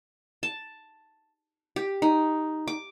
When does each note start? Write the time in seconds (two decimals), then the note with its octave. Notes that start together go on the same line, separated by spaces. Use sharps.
0.43 A5
1.76 G4
2.02 D#4
2.67 D6